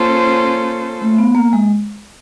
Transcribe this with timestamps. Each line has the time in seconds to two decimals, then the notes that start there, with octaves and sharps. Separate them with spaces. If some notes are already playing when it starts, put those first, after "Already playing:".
Already playing: A#3 C#4 F4 A4 C5
1.02 A3
1.18 B3
1.35 A#3
1.53 G#3